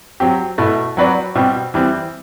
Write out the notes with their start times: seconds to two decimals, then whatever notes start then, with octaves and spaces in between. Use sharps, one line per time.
0.20 F#3 C4 G4
0.58 B2 A3 E4
0.97 F#3 C4 F#4 B4 D5
1.35 B2 G3 C4 G4
1.74 E3 G3 C4